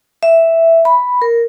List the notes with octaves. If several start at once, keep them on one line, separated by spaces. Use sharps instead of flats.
E5
B5
A#4